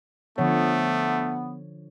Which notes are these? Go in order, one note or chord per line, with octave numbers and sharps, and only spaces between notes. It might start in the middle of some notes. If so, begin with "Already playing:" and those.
D3 F3 A3 B3 C#5